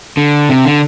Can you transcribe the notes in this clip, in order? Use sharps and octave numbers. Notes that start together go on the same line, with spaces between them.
D3
C3
D3